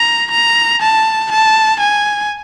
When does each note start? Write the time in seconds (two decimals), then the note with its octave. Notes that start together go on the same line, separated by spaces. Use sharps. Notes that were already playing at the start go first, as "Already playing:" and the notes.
Already playing: A#5
0.31 A#5
0.82 A5
1.31 A5
1.80 G#5